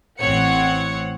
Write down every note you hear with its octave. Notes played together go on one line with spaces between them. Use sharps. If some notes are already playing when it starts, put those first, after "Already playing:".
A1 C4 C#5 F#5 C#7